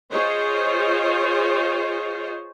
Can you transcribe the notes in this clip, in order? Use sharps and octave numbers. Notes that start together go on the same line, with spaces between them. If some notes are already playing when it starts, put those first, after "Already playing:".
F4 G#4 C5 C#5 D#5